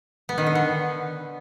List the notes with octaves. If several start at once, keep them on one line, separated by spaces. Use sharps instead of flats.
B3
D#3
D3
B3